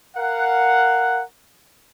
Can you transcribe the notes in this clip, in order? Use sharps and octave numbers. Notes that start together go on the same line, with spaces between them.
A#4 F5 F#5